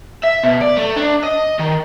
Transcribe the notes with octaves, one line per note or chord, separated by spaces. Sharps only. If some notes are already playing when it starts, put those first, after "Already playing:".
E5
B2
D5
A3
D4
D#5
D#3